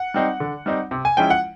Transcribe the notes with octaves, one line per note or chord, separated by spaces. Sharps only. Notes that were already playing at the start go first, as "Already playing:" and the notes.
Already playing: F#5
G3 C4 D#4
D3
G3 C4 D#4
C3
G#5
F3 G#3 C#4 E4 G5
F#5